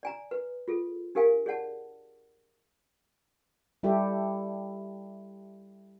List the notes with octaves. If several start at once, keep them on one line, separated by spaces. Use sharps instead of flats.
D5 G#5 A#5
B4
F4 G#4 A4
D4 G4 A#4 F5 G#5
G#4 C#5 D5 F#5 A5
G3 E4 G4 A4